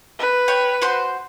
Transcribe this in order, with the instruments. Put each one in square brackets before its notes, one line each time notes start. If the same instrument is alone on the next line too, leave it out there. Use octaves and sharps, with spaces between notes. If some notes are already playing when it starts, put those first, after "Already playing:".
[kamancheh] B4
[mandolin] C#5 G5
F#4 C5 C6